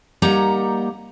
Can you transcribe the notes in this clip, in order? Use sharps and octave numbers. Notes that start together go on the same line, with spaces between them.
G3 A#3 D#4 F#5 A#5